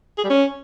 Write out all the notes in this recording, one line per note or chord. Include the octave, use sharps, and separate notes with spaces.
G#4
G3
C#4